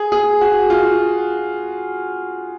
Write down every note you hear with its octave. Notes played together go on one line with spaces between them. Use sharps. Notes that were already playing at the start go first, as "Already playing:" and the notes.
Already playing: G#4
G#4
F#4
F4